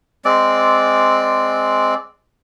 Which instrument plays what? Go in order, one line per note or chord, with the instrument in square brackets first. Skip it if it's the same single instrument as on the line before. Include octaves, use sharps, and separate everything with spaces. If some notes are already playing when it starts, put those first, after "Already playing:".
[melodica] G#3 C4 D5